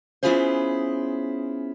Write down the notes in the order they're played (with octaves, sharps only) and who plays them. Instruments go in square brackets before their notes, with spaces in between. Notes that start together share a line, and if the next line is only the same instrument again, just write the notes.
[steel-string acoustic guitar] B3 C#4 E4 F4 G#4 C5